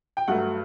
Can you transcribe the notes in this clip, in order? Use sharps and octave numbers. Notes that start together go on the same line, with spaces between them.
G5
G2 F#3 A3 F#5